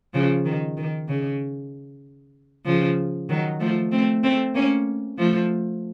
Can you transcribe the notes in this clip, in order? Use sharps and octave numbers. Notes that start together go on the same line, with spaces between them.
C#3 F3
D#3
D#3
C#3
C#3 F3
D#3 F#3
F3 A3
A3 C4
A3 C4
A#3 C#4
F3 A3